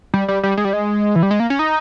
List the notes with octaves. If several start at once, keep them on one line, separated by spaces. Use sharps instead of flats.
G3
G3
G3
G#3
G3
G#3
E3
G3
G#3
A#3
C#4
D#4